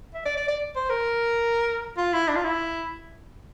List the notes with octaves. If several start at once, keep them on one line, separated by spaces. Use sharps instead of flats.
E5
D5
D5
D5
C5
A#4
F4
E4
D4
F4
E4